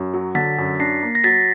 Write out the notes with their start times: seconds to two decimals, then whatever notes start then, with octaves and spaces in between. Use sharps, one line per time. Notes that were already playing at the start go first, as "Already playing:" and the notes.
Already playing: F#2
0.14 F#3
0.35 D3 A6 B6
0.58 F#2
0.79 D4 A#6 C7
1.02 A#3
1.15 A#6
1.24 F#3 A6 B6